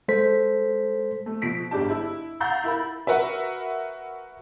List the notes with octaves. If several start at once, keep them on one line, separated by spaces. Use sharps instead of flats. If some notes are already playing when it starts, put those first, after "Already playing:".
G#3 A4 C5 B6
A3
B2 F3 B6 D7
G1 G#2 D4 G4 A5
E4
F5 F#5 A#5 E6 G6 A6
E4 A#4 B5
F#4 A#4 B4 E5